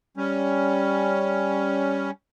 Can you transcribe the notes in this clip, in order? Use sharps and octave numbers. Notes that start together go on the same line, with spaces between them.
G3 C#4